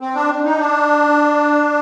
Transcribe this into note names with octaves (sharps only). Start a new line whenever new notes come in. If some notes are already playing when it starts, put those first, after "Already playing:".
C4
D4
D#4
D4